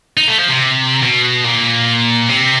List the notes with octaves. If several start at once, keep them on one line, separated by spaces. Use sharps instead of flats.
D#4
A3
F3
C3
B2
A#2
C3